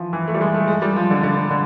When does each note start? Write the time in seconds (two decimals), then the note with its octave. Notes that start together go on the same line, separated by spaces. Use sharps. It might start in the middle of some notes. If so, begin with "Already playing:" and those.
Already playing: E3 F3
0.13 E3
0.28 A3
0.34 G3
0.41 G#3
0.54 A3
0.68 G#3
0.82 G3
0.96 F3
1.10 D3
1.23 D3
1.50 D3